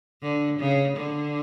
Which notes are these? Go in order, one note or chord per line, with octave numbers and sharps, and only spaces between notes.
D3
C#3
D3